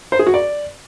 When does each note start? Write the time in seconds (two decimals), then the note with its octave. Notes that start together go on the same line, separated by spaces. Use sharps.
0.12 C5
0.19 G#4
0.27 F#4
0.34 D5